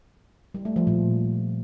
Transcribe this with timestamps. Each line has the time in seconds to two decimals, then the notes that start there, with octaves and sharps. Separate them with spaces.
0.54 G3
0.65 A3
0.76 F3
0.87 A#2